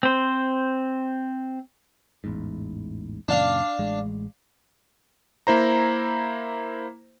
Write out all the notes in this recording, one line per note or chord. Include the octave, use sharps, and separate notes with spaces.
C4 C5
A1 E2 G#2
F#2 A#2 C#3 D4 F5
A1 G#3
A#3 E4 C5 A#5